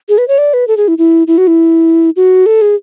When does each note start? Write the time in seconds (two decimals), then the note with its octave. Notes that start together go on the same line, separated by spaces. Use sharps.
0.09 G#4
0.18 B4
0.28 C#5
0.38 D5
0.54 B4
0.68 A4
0.77 G#4
0.88 E4
0.98 E4
1.27 E4
1.38 F#4
1.47 E4
2.16 F#4
2.46 A4
2.61 G#4